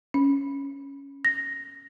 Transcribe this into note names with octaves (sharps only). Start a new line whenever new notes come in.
C#4
A#6